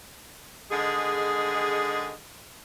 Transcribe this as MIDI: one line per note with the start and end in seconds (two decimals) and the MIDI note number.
0.71 2.11 50
0.71 2.11 51
0.71 2.11 56
0.71 2.11 68